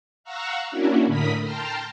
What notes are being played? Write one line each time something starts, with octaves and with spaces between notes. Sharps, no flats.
F5 F#5 A#5 C#6 E6 F#6
A#3 C#4 D4 E4 F#4
A2 D3 A#4 B5 D#6 B6
G5 A5 A#5 C6 F6